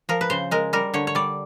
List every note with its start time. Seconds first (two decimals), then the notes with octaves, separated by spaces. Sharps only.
0.09 F3 A#4
0.21 B4
0.30 C#3 C5
0.51 G#3 A#4
0.73 G3 A#4
0.94 D3 C#5
1.07 C#5
1.15 G3 D5